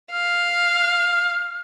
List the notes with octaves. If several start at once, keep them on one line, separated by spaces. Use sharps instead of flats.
F5 F6